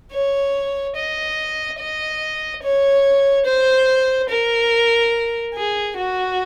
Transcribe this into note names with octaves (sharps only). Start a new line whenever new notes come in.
C#5
D#5
D#5
C#5
C5
A#4
G#4
F#4